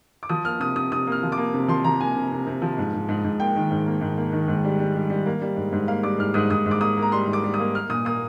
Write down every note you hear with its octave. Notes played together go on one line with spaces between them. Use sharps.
D6
F3 D#6
A#3 F6
C3 D#6
C3 D#6
C3 D#6
A#3 F6
F3
D6
A#3
C3
F3 C6
F3 A#5
A#3 G#5
C3
C3
C3
F3
G#2
G#2
G#2
G#2
A#3 G5
D#3
G#2
A#3
G#2
A#3
D#3
G#2
G3
G3
G3
G3
A#3
G3
G#2
G#2
A#3 F5
G3 D6
G#2 F6
G#2 D#6
G#2 D#6
G#2
D6
A#3 D#6
A#3
A#5
G3 C6
G#2
D6
G3
D#6
A#3
A#3 F6
A#2 D#6
A#3 D#6